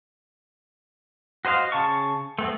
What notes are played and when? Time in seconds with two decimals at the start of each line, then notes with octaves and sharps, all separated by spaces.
1.45 F#4 C5 D#5 F5
1.72 C#3 A5 C#6
2.39 A3 B3 C4